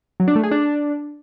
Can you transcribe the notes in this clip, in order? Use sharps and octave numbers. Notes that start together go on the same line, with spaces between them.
F#3
D4
A3
G#4
D4